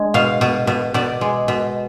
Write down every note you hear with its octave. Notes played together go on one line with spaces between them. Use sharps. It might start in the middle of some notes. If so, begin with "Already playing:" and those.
Already playing: G#3 D4
B2 F5
B2
B2
B2 D5
G#3
B2